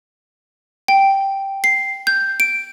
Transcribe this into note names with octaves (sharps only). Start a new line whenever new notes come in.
G5
C7
G6
D7